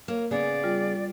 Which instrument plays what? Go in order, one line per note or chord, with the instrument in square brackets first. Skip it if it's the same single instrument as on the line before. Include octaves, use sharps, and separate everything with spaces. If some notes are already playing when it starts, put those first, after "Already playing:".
[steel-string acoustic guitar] A#3 C#5
[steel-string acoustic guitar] C#3 B3 G#4 [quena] D5
[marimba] G3 F4